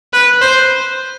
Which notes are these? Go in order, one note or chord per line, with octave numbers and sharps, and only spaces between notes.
B4
C5